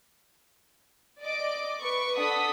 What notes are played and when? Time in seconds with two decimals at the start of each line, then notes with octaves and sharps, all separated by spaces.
1.21 D5 D#5 D6
1.81 B4 C#6
2.16 D4 A4 F#5 D#6 B6